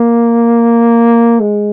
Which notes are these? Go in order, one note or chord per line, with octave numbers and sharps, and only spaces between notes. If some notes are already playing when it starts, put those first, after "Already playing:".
Already playing: A#3
G#3